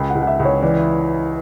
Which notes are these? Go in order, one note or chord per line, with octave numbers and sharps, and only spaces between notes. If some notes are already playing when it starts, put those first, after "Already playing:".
Already playing: C#2 G5
F#5
C#2
F#5
E5
C#2
C#5
E3 D5